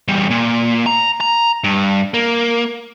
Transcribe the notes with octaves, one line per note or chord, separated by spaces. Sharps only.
E2 G3
A#2
A#5
A#5
G2
A#3